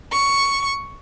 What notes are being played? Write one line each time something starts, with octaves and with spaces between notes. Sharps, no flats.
C#6